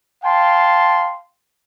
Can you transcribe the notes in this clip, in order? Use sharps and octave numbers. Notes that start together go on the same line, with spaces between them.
F5 G5 A5 C6